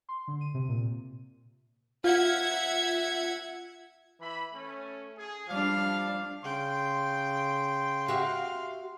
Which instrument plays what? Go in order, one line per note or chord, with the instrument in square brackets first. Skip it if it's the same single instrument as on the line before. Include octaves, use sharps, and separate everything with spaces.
[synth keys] C6
D3
D#7
C3
A#2
[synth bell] F4 [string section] E5 F#5 G#6
[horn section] E3 E5 B5
A3 C#4
G#4
[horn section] F3 F5 [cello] G3 D4
[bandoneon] C#3 [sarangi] G5 [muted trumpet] C6
[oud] F#4 G4 E5 [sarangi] F5